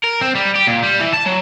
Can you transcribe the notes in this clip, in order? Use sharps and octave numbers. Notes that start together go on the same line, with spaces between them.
A#4
C4
G3
G4
A#2
G3
E3
A5
F#3